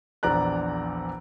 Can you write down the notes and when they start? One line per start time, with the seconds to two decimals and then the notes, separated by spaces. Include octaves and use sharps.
0.23 A#1 E2 D5 A#5 F#6